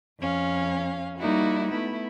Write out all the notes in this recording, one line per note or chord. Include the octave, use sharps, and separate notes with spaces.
F2 C#4 F5
G3 A#3 D#4 E4 F#4
A3 B3 E4